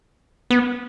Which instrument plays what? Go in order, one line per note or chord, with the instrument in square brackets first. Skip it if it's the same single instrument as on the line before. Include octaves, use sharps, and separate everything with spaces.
[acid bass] B3